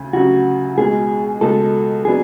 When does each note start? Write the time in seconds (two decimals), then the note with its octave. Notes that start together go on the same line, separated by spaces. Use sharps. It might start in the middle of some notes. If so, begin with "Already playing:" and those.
Already playing: D2 C#3 C#4
0.13 D2 C#3 F#3 C#4 F#4
0.78 C#2 B2 G#3 G#4
1.41 C#2 B2 G#3 A4
2.05 F#3 B3 D4 G#4